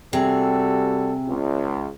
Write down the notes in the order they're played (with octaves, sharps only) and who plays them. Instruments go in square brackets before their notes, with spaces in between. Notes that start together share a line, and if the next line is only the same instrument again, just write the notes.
[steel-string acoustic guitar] C3 G#4 [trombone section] G3 F#4 A4
[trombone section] C#2